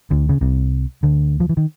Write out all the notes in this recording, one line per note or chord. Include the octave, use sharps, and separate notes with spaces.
D2 D3
C#3
C2 C3
D2 D3
F3
E3
D#3